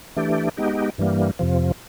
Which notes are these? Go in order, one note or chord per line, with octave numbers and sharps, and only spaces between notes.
E3 A3 D4 G4
G#3 B3 D#4 G4
G2 E3 G3 A#3
F2 C3 F3